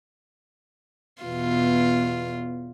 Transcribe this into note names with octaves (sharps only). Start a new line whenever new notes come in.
E2 B2 F4